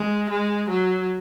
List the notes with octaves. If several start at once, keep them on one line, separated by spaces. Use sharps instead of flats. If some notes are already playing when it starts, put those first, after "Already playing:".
Already playing: G#3
G#3
F#3